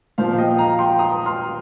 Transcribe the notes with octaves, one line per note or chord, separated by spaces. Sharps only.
A#2 F3 C5 F5
D#5 G5
F5 A#5
G5 C6
A#5 D#6
C6 F6